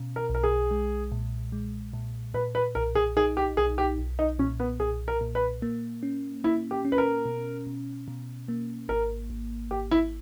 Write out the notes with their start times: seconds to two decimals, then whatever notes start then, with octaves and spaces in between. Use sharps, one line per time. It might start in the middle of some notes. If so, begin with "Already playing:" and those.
Already playing: B2 C#4
0.16 A#4
0.30 B1 A#4
0.44 G#4
0.71 G#3
1.12 A#2
1.52 G#3
1.93 A#2
2.34 A#2 B4
2.55 B4
2.75 B1 A#4
2.95 G#4
3.17 D#4 G#4
3.37 G4
3.57 B1 G#4
3.78 G4
3.98 B1
4.19 D#4
4.39 A#2 C#4
4.60 B3
4.80 B1 G#4
5.08 A#4
5.21 A#2
5.35 B4
5.62 A#3
6.03 C#4
6.44 A#3 E4
6.71 G4
6.85 C#4
6.92 B4
6.98 A#4
7.26 B2
7.67 B2
8.08 B2
8.48 A#3
8.89 G#1 A#4
9.30 G#1
9.71 G#1 G4
9.91 E4